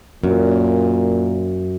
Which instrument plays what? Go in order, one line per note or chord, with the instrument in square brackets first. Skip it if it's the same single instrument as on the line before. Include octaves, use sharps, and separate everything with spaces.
[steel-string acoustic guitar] F#2 [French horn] A#2